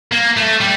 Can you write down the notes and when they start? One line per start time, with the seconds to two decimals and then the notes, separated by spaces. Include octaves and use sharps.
0.12 A#3
0.37 A3
0.61 G3